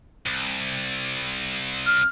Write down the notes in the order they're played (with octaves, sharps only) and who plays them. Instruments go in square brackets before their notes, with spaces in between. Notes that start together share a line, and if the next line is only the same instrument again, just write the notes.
[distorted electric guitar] C2
[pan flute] F6